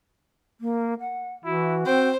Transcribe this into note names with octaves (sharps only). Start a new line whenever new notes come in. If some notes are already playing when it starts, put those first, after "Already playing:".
A#3
F#5
E3 E4 F#4
C4 C5 G5